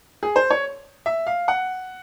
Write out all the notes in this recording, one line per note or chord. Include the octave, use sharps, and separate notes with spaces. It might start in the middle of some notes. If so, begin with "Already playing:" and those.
G#4
C5
C#5
E5
F5
F#5